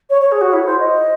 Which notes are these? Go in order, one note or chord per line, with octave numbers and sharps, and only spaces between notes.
C#5
C#5
G#4
F#4
E4
A4
C5
D#5